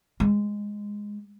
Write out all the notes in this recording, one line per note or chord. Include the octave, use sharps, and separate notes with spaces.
G#3